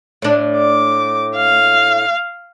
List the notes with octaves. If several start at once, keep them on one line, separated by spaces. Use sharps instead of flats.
A2 D4
D6
F5